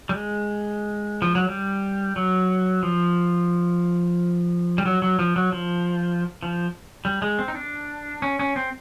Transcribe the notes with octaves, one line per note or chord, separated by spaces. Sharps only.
G3
G#3
F3
F#3
G3
F#3
F3
G3
F#3
F#3
F3
F#3
F3
F3
G3
G#3
C4
D#4
D4
C#4
C#4
C4